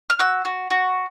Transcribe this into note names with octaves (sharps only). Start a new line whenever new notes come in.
F6
F#4 E6
F#4
F#4